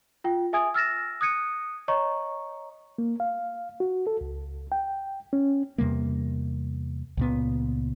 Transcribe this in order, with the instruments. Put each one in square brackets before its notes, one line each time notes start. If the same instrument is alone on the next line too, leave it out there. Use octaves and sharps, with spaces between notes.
[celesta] F4 G5
G#4 E5 G#5 D#6 G#6 D7
E6 F6 A6 A#6 E7
D#6 F#6 G#6 C#7 D#7
C#5 D#5 A#5 C#6
[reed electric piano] A#3
F5
F#4
A4
C#2
G5
C#4
[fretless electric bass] E2 C3 G3 A#3
C#2 A#2 B3